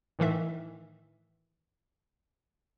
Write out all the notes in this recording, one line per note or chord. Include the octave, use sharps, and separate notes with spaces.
A2 D#3 E3 E5